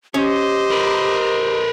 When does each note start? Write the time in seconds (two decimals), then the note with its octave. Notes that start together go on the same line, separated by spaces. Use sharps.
0.14 C#4 G4 C5 D#5
0.71 A#4 B4